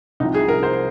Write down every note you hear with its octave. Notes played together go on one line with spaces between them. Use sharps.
C2 C3 F3 D#4
G#4
A#4
C5